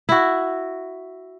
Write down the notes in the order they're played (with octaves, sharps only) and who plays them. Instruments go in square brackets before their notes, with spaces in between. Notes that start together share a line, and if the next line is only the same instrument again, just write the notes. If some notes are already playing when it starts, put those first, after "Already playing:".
[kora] E4 F#4